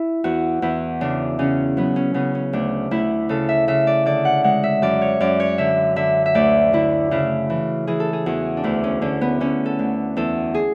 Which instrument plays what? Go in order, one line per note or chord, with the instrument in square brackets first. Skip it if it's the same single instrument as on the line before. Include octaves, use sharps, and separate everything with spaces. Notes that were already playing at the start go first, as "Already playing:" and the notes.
Already playing: [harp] E4
E2 F#4
E2 E4
C#3 D4
C#3 C#4
F#3 B3
C#4
C#3 B3
C#4
D2 D4
D2 E4
C#3 A4
E5
C#3 E5
D5
D3 D5
F#5
G#3 F#5
E5
F#2 D5
C#5
F#2 D5
C#5
D3 E5
D3 E5
E5
D2 D5
D3 E4
C#3 E4
E3
E3 G#4
A4
G#4
E2 F#4
D4
D2 E4
C#4
D3 C#4
B3
D3 C#4
A4
D2
E2 A4
G#4